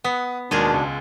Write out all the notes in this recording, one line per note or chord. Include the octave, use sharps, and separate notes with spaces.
B3 F#5 D#6 B6
D#2 B2 G#3 D4 F4 G#4 A#4
C#2